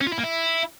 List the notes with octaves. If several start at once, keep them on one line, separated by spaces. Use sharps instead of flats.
C#4
F4
E4
A#3
E4